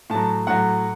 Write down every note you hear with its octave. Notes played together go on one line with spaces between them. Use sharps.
A2 F#3 A5
A2 F#3 F#5